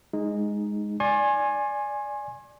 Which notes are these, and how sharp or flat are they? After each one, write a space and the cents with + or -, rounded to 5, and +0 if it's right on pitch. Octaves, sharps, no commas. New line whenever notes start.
G#3 +0 D#4 +0
D5 +0 G#5 +0 C6 +40